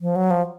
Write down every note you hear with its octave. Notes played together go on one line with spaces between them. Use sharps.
F3
F#3
F3